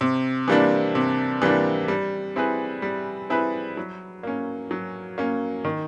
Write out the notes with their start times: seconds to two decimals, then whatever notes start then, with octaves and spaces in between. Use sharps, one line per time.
0.01 C3
0.48 E3 G3 A#3 D4
0.95 C3
1.42 E3 G3 A#3 D4
1.88 G3
2.36 C4 E4 G#4 B4
2.82 G3
3.30 C4 E4 G#4 B4
3.77 F#3
4.23 A#3 C#4
4.71 F#3
5.18 A#3 C#4
5.65 D#3